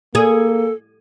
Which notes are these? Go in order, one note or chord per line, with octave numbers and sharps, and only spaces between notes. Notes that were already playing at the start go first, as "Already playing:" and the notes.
A#3 G#4 A4